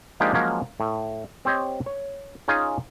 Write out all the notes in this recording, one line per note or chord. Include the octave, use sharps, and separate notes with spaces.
F3 G#3 A#3 D4 D#4 G4
F3 F#3 G#3 A#3 C#4
A2
C4 G4 C5 C#5 D#5
C#5
C#4 D#4 F4 G#4 C#5 D#5